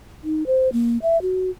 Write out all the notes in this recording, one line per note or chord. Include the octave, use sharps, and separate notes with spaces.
D#4
C5
A#3
E5
F#4